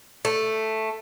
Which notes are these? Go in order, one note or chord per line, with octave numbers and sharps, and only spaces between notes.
A3